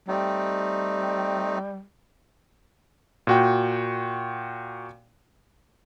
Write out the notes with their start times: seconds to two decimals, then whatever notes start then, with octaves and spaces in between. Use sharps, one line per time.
0.08 G3 A3 C4 D#4
3.27 A#2 F#4 G5